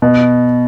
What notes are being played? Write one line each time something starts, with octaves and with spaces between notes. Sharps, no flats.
B2